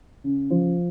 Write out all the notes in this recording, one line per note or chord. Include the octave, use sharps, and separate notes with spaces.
C#3
F3